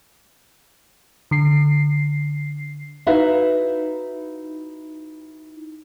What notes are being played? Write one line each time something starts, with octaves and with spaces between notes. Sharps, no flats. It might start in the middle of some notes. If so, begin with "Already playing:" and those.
D3 C7
D#4 E4 F#4 B4 E5 F5